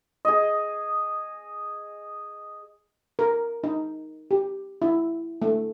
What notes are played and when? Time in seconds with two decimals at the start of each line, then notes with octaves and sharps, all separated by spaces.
0.25 G#4 D#5
3.19 A#4
3.64 D#4
4.31 G4
4.82 E4
5.42 A3